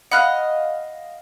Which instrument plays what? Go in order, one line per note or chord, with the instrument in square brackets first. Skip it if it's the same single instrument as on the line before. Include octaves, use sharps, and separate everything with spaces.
[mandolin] D#5 F5 [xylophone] F#5 B5 F#6